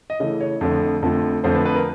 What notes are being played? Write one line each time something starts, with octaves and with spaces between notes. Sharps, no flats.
D#5
C#3 E3 A3 D#5
C#5
F2 D3 F3 A3
F2 D3 F3 A3
F2 D3 F3 A3 C5
B4
B4
A#4